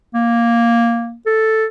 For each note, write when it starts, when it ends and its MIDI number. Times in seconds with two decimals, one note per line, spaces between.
0.14 1.16 58
1.26 1.65 69